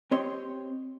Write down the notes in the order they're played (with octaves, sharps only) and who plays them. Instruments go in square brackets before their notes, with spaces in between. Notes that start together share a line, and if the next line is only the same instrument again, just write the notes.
[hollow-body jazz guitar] C4 G4 C#5 D#5 C6